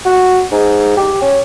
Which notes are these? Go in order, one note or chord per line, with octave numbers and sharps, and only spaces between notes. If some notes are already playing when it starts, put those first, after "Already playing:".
F#4
G#2
G4
C#4